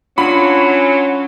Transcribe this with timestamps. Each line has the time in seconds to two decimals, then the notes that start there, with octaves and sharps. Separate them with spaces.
0.18 F#3 C#4 D4 F4 B5